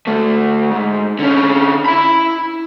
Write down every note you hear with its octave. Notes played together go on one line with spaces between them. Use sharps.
D2 A3
G#2
D3 C#4
E4 B5